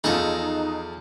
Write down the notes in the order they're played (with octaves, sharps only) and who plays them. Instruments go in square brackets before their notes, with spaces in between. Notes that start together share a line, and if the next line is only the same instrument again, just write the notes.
[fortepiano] E2 F3 [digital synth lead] D#4 [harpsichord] G#4 A4 C#6